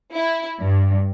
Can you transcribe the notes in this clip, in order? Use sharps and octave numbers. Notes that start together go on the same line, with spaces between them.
E4
G2